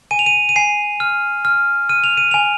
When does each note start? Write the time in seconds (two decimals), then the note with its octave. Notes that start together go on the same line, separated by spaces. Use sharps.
0.11 G#5 D#7
0.19 F7
0.26 D#7
0.49 D#7
0.56 G#5 C7
1.00 F6
1.45 F6
1.89 F6 D#7
2.04 F7
2.17 D#7
2.31 G#5 F7